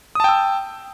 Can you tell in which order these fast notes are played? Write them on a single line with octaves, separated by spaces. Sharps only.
D#6 A5 G5 E6